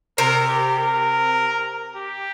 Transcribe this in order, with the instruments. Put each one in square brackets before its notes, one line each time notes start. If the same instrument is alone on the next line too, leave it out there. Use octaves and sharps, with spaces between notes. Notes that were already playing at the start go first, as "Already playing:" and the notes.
[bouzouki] C3 [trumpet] A#4
[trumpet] G4
A#4
G4